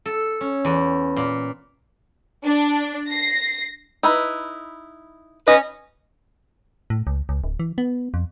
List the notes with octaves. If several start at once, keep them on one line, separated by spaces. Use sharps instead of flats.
A4
C#4
E2
A#2
D4
A#6 C7
D#4 E4 B4
C#4 B4 D#5
A2
C#2
C#2
D1
E3
B3
F2